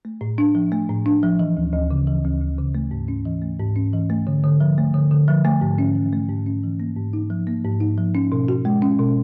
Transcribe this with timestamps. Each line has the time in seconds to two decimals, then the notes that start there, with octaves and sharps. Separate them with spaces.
0.05 A3
0.21 A2
0.38 D4
0.55 F3
0.72 A3
0.89 A2
1.06 D4
1.23 F3
1.39 E3
1.57 D2
1.73 D2
1.91 C#3
2.07 E3
2.24 D2
2.41 D2
2.58 C#3
2.75 A3
2.91 G#2
3.08 C#4
3.25 E3
3.42 A3
3.59 G#2
3.76 C#4
3.93 E3
4.10 A3
4.27 D3
4.44 D3
4.60 F3
4.78 A3
4.94 D3
5.11 D3
5.28 F3
5.45 A3
5.61 G#2
5.78 C#4
5.95 E3
6.13 A3
6.29 G#2
6.46 C#4
6.63 E3
6.80 A#3
6.97 G#2
7.13 D#4
7.30 F3
7.47 A#3
7.64 G#2
7.81 D#4
7.98 F3
8.15 C#4
8.32 B2
8.48 F#4
8.65 G#3
8.82 C#4
8.99 B2